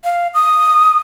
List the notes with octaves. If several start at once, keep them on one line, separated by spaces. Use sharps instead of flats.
F5
D#6